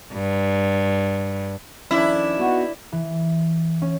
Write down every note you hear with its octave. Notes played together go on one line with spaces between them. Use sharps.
G2
F2 D#3 C#4 D4 E4 D5 E5
B3 C#4 D#4 F#4
E3
C#4